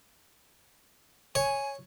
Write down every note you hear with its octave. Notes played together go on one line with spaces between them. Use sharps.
C#5 G#5